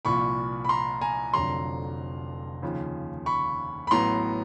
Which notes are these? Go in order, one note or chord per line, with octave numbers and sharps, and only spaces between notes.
C2 A#2 F3 B5 C#6
B5
A#5 C6
G#5 A#5
F1 F2 D3 F#3 A#5 C6
D#2 C#3 F3
B5 C#6
B5
A1 A2 F#3 B3 A#5 C6